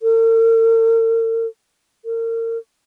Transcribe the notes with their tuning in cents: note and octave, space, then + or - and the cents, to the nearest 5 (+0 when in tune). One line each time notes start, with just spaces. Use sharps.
A#4 -45
A#4 -35